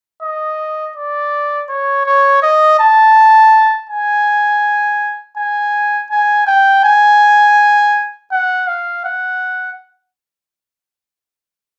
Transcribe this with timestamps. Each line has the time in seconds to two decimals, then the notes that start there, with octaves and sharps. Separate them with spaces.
0.22 D#5
0.96 D5
1.69 C#5
2.06 C#5
2.42 D#5
2.80 A5
3.89 G#5
5.37 G#5
6.11 G#5
6.47 G5
6.84 G#5
8.32 F#5
8.67 F5
9.05 F#5